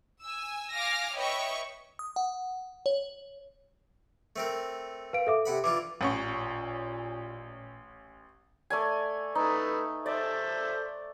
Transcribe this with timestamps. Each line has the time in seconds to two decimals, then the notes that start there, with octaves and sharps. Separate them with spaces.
0.23 G#5 E6
0.73 F5 G#5 D6 F6 A#6
1.16 B4 C#5 D#5 E5 G5 C#6
1.99 D#6
2.16 F#5
2.86 C#5
4.36 A3 C4 A#4
5.13 B4 F5 D7
5.27 A4 E5 D6
5.46 C3 F#5 B5
5.64 E3 D4 F4 D6
6.01 A1 A#2 C#4 C#6
8.70 A3 D5 G#5
9.35 A3 D#4 B4
10.06 A4 C5 D5 E5